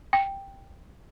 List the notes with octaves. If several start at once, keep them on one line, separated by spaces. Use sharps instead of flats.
G5